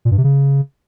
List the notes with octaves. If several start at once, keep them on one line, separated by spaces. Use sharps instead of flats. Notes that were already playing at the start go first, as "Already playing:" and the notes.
A#2
G2
C3
C#3